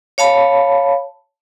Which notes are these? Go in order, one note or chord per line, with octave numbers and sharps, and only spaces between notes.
C#5 F5 A5 B5